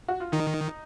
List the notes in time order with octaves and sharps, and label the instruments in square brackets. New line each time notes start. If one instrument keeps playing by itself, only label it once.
[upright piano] F#4
F4
[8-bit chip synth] D#3 [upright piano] D#4